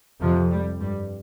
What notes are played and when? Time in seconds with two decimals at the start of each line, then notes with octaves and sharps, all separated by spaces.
0.20 F2 C3 F3
0.50 G3
0.79 G2 G3